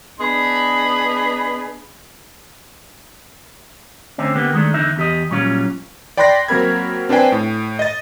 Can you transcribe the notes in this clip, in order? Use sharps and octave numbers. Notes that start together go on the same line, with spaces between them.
B3 D4 G#4 D#5 B5
D3 A3 C4 C#4
D3 A#3 B3 G4
D#3 G#3 A3 D4
E2 D3 D#4 E5
E2 G4 D#5
A#2 F#3 G3 C#4 F4
D5 G5 B5 C6 F#6 A#6
F#3 A#3 C4 A#4 B5 G#6
C4 D4 B4 C5 G5 G#5
A2
D#5 A6